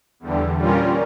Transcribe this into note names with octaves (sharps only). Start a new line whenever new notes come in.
E2 D3 G3
A#2 G3 C#4 F4 A#4